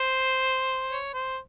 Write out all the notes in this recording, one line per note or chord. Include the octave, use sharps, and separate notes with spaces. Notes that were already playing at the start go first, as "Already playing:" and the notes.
Already playing: C5
C#5
C5